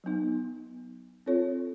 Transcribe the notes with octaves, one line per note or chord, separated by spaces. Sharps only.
F#3 B3 D#4
C4 F4 A4 C#5